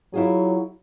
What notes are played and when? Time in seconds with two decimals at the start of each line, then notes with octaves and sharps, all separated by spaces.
0.14 F#3 E4 F4 G#4